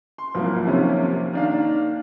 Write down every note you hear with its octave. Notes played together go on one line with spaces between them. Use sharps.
C6
C2 F3 F#3 A#3
D#2 C3 C#4
D#3 A#3 D4 F5